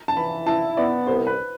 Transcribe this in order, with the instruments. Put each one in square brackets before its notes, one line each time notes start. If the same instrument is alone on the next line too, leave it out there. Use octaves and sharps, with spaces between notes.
[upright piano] A5
[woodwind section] E3 [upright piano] B5
[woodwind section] E4 [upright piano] A5
[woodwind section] B3 [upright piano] D5
[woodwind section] C2 [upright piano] C5
[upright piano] B4